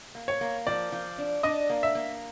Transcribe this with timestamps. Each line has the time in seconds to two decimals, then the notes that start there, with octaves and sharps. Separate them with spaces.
0.15 A#3
0.28 C#5
0.41 A#3
0.67 F3 D5
0.92 F3
1.18 D4
1.43 D4 D#5
1.70 A#3
1.83 E5
1.95 A#3